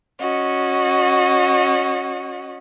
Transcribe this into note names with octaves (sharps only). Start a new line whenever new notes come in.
C#4 F#4 D#5